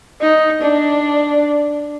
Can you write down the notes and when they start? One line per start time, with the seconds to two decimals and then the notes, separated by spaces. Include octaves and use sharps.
0.22 D#4
0.62 D4